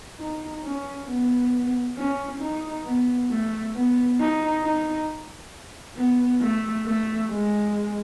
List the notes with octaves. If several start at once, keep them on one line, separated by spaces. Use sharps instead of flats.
D#4
C#4
B3
C#4
D#4
B3
A3
B3
D#4
D#4
B3
A3
A3
G#3